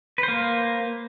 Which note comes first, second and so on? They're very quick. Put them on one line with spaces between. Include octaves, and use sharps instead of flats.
B4 C5 A#3